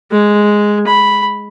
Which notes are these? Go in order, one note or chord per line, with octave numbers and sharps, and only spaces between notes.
G#3
B5